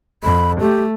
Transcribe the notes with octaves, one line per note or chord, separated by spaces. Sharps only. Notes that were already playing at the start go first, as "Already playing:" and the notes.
F2 B5
A3 G4